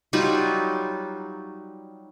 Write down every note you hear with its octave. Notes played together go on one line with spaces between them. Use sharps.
F#3 G3 D#4 F4